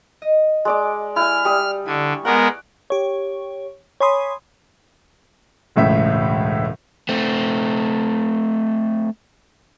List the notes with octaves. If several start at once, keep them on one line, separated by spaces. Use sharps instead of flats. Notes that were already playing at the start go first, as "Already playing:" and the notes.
D#5
G#3 D5 D6
E4 G4 G#5 F6
G3 D#6
D3 E4 G#5 C#6
G#3 B3 A#4 F#5 D6
G4 C#5
C#5 G#5 B5 C6 D#6
E1 C#2 A2 E5
A3 C4